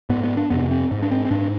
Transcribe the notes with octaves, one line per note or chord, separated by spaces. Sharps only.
G#2 B3
B3
D4
F2 C3 B3
C4
G#2
D4
C4
C4
G#2 D4